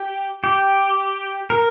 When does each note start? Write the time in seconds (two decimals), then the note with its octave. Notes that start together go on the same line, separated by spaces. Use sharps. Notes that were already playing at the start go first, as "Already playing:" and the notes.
Already playing: G4
0.44 G4
1.50 A#4